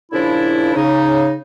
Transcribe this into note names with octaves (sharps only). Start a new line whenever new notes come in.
A#2 C#3 F3 D4 E4
C#3 D#4